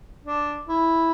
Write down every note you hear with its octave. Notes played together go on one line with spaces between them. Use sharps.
D4
E4